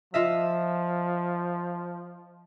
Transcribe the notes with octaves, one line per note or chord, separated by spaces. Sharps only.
F3 F4 D#5 E5